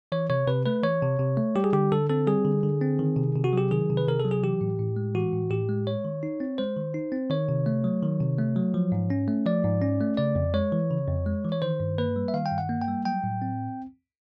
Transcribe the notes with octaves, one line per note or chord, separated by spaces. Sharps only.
E3 C#5
C3 C#5
C3 B4
A3 B4
E3 C#5
C3
C3
A3
G3 G4
G#4
D3 G4
D3 A4
C4 A4
G3 G#4
D3
D3
C4
D#3
C3
C3
F#4
F#3 G4
D#3 G#4
C3
B4
C3 A#4
A4
F#3
G#4
E3 G4
A2
A2
G#3
E3 F#4
A2
A2 G4
G#3
G#3 C#5
D#3
D#4
C4
G#3 C5
D#3
D#4
C4
D#3 C#5
C3
A3
F#3
D#3
C3
A3
F#3
F3
G#2
C#4
A3
F3 D5
G#2
C#4
A3
C#3 D5
F2
G#3 C#5
E3
C#3
F2
G#3
E3
C#5
D#3 C5
G2
A#3 B4
G3
E5
D#3 F5
G5
G2
F#5
A#3
G5
G3
F#3 G5
A2
C4